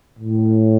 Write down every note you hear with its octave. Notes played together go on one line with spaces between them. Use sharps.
A2